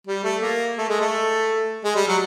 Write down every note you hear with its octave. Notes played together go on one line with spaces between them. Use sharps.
G3
A3
A#3
A3
G#3
A3
G#3
G3
F#3